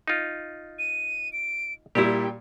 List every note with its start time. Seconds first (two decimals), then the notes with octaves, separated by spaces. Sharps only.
0.08 D#4 F4
0.79 D#7
1.33 D7
1.95 A#2 G3 E4 G4 G5